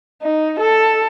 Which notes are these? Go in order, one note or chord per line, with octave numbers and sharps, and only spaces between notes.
D#4
A4